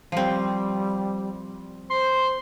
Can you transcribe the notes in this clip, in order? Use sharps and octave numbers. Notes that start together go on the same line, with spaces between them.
F3 G3 C4
C5 C6